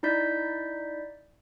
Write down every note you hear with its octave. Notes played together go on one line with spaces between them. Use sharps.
D#4 E4 D5 G6 B6